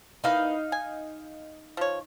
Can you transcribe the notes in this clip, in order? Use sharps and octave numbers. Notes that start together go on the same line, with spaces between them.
E3 A#3 D#4 B4 F5
G#5
F3 C#5